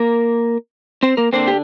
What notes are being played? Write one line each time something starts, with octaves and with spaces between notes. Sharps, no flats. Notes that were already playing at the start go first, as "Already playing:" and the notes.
Already playing: A#3 A#4
C4 C5
A#3 A#4
D3 A#3 C4 D4 C5
G4